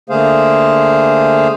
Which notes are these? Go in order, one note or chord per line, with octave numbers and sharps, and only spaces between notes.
D3 A3 A#3 G#4 C5 F5